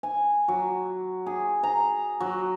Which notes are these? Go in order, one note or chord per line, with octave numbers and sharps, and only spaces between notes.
G#5
F#3
G#4
A#5
F#3